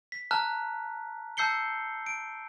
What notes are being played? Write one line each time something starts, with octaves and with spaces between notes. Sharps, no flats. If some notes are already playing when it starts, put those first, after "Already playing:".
B6
A5 A#5 F6 F#6
A5 E6 G6 C7 C#7 G7
D7